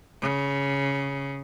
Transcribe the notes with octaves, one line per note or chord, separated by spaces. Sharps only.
C#3